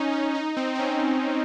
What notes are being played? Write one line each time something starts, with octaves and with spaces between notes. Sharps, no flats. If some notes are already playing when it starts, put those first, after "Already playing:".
Already playing: C#4 D#4
D#4
D#4
C4
C4
C#4